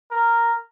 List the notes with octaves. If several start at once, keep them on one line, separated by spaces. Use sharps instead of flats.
A#4